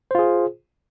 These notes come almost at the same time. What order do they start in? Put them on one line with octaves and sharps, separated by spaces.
C5 F4 G#4